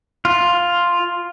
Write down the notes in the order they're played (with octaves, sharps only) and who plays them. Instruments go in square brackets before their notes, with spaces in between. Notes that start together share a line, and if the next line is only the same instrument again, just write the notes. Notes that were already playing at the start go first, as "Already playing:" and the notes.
[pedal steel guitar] F4